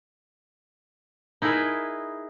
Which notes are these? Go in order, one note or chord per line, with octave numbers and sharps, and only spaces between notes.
D#4 E4 G#4 A#4 B4 E5